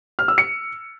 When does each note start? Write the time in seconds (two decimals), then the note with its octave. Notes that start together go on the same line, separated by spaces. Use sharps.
0.19 F6
0.28 E6
0.38 C#7